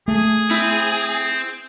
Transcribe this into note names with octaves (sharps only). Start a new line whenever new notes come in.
A3 G#4
C4 E4